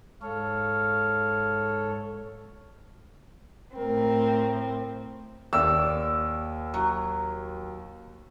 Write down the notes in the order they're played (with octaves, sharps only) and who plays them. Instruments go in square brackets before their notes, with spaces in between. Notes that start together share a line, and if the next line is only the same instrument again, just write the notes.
[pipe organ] G#2 A4 C#5 [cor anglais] F5
[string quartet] A2 C4 [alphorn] A#4
[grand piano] D#2 [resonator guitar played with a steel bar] D5 [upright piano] E6
[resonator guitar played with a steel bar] F#3